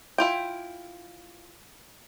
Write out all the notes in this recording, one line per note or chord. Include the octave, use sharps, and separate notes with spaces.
E4 F4 G5